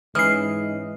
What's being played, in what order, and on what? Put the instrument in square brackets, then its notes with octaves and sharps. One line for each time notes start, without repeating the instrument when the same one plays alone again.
[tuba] G#2 [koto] E3 [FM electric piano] C#4 D#5 [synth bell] F6 C7